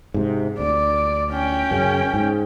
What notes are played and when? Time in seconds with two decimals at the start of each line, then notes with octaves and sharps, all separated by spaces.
0.14 G#2 C3
0.59 D2 D5
1.32 C#4 G5
1.71 F#2 C#3
2.14 G#2